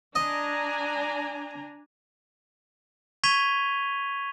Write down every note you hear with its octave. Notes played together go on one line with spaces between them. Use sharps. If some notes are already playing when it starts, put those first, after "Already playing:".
D4 D#5 G#5 A#5
C#6 G#6 B6 D#7 F7 G7